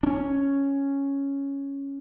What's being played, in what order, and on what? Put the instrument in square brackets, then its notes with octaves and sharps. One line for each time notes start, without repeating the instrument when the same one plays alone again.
[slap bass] C#4 D4